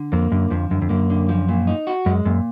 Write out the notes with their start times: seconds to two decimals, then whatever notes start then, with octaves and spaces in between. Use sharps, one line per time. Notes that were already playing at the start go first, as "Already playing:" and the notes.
Already playing: D3
0.12 F2 A#3
0.32 F#2 D3
0.50 F2 F3
0.71 F#2 D3
0.82 F2
0.89 F#2 A#3
1.10 D3
1.29 F3
1.48 A#2
1.67 D#4
1.87 F#4
2.06 F#2 G#3
2.25 F#2 A#2